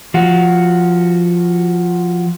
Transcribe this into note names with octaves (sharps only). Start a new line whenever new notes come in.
F3 F#4